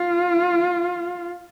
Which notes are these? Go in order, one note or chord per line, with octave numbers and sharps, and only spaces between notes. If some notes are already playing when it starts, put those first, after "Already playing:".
Already playing: F4